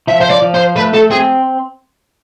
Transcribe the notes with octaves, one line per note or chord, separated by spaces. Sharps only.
F3 E5
C5
D5
F3
C5
A3 B4
A4
C4 G#4